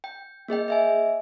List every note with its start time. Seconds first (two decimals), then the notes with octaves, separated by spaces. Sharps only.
0.04 G5
0.48 A#3 G#4 D#5 G5
0.68 D#5 E5 G#5